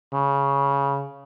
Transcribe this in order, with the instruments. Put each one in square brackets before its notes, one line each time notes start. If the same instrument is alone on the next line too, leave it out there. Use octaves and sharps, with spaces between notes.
[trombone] C#3